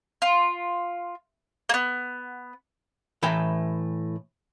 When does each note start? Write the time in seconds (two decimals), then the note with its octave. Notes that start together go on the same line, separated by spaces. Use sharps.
0.22 F4
1.69 A#3 B3
3.23 A2 E3 B4 E5 G5 A#5